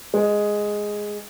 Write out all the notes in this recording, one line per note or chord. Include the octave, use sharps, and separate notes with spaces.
G#3